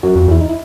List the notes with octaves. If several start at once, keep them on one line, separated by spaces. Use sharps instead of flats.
F#2 F#4
F2
E2 E4
D#4
E4